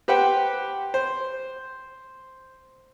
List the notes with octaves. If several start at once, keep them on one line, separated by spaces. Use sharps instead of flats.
G4 B4 C5 F#5 G5
C5